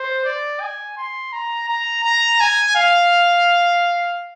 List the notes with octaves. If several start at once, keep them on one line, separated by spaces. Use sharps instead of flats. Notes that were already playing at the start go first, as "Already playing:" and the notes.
Already playing: C5
D5
G#5
C6
A#5
A#5
A#5
G#5
F5